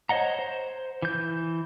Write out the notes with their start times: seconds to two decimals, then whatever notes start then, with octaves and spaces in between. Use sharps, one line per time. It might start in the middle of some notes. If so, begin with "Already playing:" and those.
0.09 C5 C#5 D#5 F#5 A#5
0.39 C5
1.02 E3 G6